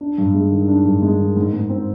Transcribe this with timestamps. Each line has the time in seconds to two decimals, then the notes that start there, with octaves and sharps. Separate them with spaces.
0.01 D4
0.18 G2
0.34 G#3
0.51 D#3
0.68 D4
0.85 G2
1.02 G#3
1.20 D#3
1.37 G#2
1.54 G#2
1.69 C4